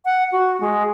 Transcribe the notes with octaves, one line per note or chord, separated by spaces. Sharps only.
F#5
F#4
G#3